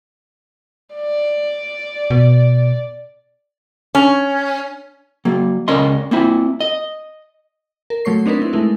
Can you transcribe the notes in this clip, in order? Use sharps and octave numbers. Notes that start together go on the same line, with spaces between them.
D5
B2
C#4
F#3 A#3
C#2 C#4 A#4 D5 D#5 C6
A#3 C4 E4
D#5
A#4
F#3 A3 C#5 C#6 C7
C4 D4 D#4 A#4 B4
C4 E4
G#3 A3 D#4 E4 A#4